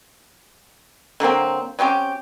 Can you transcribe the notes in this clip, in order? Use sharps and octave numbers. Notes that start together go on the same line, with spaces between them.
D3 F#3 A#3 C4
F#3 C4 C#4 G4